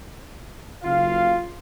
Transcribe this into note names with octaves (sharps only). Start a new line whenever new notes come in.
F#1 F4 F5